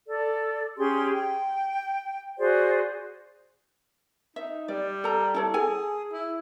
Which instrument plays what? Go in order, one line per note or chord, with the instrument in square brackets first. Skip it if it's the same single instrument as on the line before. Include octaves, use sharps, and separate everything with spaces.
[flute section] A4 D5
C#4 G4 G#4 C6
G5
F#4 G#4 C5 D5
[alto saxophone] D#4 [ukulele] E5
[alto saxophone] G3 [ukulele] D5
[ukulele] A4 A#5
E4 A4 C#5
[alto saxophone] G#4 [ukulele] A4 G#5
[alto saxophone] E4